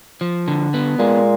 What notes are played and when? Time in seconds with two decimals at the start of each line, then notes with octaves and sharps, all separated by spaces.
0.21 F3
0.48 D3
0.74 B3
0.99 A#2 G#3